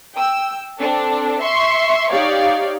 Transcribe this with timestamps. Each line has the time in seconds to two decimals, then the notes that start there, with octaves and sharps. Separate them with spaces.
0.15 G5 E6
0.79 C4 D4 A4
1.41 E5 C6 C#6
2.10 D#4 G4 C#5 D5 F5